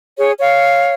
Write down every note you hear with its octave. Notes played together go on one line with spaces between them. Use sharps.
G#4 C#5
C#5 F5